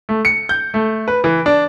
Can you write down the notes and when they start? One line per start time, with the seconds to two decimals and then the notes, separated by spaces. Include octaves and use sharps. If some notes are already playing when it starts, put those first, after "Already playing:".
0.09 A3
0.25 C#7
0.49 G6
0.74 A3
1.08 B4
1.24 E3
1.46 D4